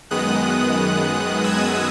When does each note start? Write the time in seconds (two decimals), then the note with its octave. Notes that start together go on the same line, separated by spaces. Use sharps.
0.11 F#2 D#3 G#3 B3 D#6 F#6
1.44 E6 G#6